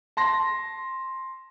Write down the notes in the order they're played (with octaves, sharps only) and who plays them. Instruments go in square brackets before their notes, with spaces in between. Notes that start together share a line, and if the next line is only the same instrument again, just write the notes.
[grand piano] A5 C6 A#6